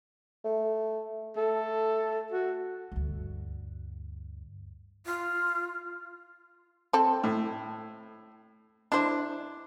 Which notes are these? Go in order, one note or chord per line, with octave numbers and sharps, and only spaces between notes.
A3
A3 A4
F#4
D2 G2
F4
C4 A4
A2
D4 E4 C5